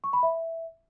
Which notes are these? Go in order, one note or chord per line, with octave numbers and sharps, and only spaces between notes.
C#6
B5
E5